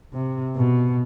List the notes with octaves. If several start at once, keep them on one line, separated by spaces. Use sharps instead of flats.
C3
B2